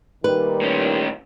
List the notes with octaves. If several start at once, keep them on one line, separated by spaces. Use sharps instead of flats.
A#2 D#3 G3 B4
A2 C#4